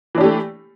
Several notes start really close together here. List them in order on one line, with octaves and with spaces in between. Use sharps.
E3 D4 G4 A3